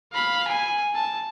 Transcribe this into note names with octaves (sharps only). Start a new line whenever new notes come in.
F5 B5
G#5
A5